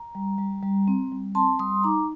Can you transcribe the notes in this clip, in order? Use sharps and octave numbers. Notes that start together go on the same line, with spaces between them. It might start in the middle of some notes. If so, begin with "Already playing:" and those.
Already playing: A#5
G3
G3
G3
C4
G3
C4 A5 C6
G3 C6 D#6
D#4 A#5 D6